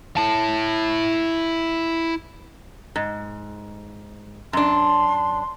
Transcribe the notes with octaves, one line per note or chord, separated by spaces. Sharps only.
E4 A5
G#2
F#2 D4 C6